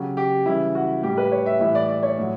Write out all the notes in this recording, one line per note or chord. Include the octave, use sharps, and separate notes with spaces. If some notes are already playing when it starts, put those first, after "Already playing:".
Already playing: C#3 F#3 G4
G4
C#3 E3 G3 E4
F#4
A2 G3 G4
B4
C#5
E5
A2 E3 G3 E5
D5
D5
C#5
A2 F#3